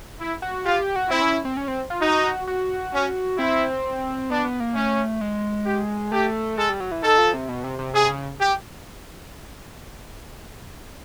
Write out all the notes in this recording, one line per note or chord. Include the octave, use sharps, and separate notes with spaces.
E4
F#4
F4 G4
G4
F#4
C4 E4
C#4
C4
C#4
C4
F4
D#4 F#4
F#4
C#4
C4 E4
B3 D4
B3
A#3
A3 C#4
G#3
G4
A3 G4
G#3 A4
G3
F#3
E3
D#3 A4
F3
C3
B2
C3
C3
C3 G#4
C#3
G4